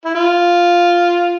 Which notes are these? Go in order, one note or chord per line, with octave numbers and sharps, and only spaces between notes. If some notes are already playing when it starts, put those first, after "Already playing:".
E4
F4